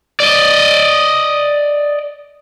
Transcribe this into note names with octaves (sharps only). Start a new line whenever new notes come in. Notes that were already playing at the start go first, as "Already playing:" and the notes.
D5 D#5